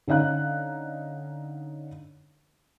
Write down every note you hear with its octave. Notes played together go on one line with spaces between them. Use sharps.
D3 C#4 D#4 F5 F#6